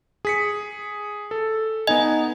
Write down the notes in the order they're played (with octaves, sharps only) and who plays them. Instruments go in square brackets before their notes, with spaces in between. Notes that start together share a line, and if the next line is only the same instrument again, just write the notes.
[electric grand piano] G#4 B6 C#7
A4
[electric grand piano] B3 D#4 G#5 [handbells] D#5